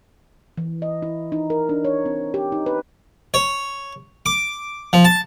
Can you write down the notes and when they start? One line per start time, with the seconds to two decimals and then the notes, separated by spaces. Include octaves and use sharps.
0.57 E3
0.82 D#5
1.02 E4
1.32 D#4
1.50 A#4
1.69 D4
1.85 C#5
2.06 C4
2.34 G4
2.52 D#4
2.66 B4
3.34 C#5
4.26 D6
4.93 F3
5.05 A5